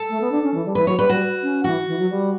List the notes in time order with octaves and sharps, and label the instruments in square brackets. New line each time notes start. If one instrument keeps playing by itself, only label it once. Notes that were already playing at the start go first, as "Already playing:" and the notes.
Already playing: [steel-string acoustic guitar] A4
[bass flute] A3
B3
D4
C#4
E3
G3
[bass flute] E3 [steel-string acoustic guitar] B4
[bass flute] F#3 [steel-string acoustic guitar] C#5
[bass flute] G3 [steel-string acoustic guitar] B4
[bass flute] G3 [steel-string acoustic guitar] F#4
[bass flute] C#4
[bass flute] E3 [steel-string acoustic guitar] F#4
[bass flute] E3
F#3
G3